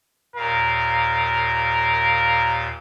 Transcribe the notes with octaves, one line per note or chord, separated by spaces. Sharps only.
D#2 A#2 A#4 F5